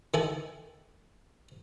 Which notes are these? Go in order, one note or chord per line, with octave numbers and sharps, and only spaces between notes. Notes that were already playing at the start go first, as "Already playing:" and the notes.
D#3 E4 A4 G#5